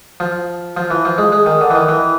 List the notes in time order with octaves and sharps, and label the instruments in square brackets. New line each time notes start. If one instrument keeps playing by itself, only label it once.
[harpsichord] F3
F3
E3
F3
G#3
G#3
D#3
D3
E3
D#3
E3